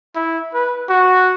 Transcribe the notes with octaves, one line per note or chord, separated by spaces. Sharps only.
E4
B4
F#4